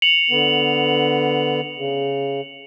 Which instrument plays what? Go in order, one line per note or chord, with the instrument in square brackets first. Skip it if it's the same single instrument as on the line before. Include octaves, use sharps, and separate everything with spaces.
[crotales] C#7 F7 F#7
[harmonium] D3 B3
C#3